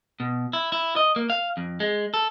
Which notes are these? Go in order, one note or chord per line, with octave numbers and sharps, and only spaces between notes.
B2
E4
E4
D#5
A#3
F5
F2
G#3
A4